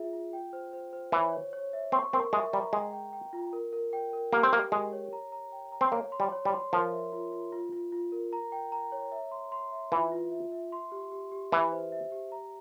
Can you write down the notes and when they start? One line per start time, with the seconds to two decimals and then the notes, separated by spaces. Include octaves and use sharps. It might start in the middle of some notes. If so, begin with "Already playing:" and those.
Already playing: F4 G#4 E5
0.13 F4
0.33 G5
0.53 C5
0.73 C5
0.93 C5
1.12 E3 C#5
1.33 C#5
1.53 C#5
1.73 E5
1.92 C4 C#6
2.13 C4 A#4
2.33 G#3 E5
2.53 G3 A#5
2.72 G#3 G5
2.93 G5
3.13 G5
3.33 F4
3.53 A#4
3.73 A#4
3.93 G5
4.13 A#4
4.33 A#3 G4
4.43 C4
4.53 A#3 G4
4.72 G#3 G4
4.93 C#5
5.13 A#5
5.32 A#5
5.52 G5
5.72 A#5
5.81 C4
5.92 A#3 C#5
6.12 C6
6.20 G3
6.32 C#5
6.45 G3
6.52 C6
6.72 F3 A#4
6.92 E5
7.13 F4
7.32 F4
7.52 F4
7.73 F4
7.92 F4
8.12 A#4
8.33 A#5
8.52 G5
8.72 A#5
8.92 C#5
9.12 E5
9.31 C6
9.52 C6
9.72 E5
9.92 E3 F4
10.12 F4
10.32 E5
10.52 E5
10.72 C6
10.92 G4
11.12 G4
11.32 G4
11.52 E3 E5
11.72 C5
11.92 E5
12.12 G4
12.32 A#5